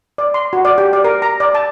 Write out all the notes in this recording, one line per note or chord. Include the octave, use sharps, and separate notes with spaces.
D5
C6
F#4
D5
G4
D5
A#4
A#5
D5
A5